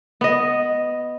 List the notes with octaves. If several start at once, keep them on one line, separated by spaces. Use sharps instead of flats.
B3 D#5